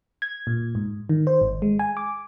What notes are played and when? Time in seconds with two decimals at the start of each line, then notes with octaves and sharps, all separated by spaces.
0.22 G#6
0.47 A#2
0.75 G#2
1.09 D#3
1.27 C5
1.41 G#1
1.62 G#3
1.79 G#5
1.97 D6